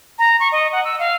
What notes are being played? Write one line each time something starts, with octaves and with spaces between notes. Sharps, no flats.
A#5
C#6
D#5
F#5
E6
F5